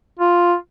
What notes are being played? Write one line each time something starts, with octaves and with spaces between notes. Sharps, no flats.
F4